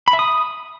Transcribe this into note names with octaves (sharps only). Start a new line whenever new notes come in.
B5
E5
D#6